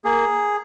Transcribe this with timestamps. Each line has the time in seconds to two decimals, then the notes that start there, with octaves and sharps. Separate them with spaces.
0.04 A#3 G#4